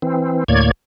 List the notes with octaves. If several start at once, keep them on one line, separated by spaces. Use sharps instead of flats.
E3 C4
D2 A2 A#3 C#5 D5 G#6